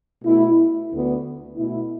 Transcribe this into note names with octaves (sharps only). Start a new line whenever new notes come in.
B2 A3 E4
D2 D3 B3
B2 A3 E4